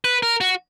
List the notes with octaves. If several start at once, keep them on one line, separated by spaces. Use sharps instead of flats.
B4
A#4
F#4